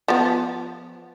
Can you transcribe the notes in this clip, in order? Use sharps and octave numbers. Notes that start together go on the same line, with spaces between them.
F3 B3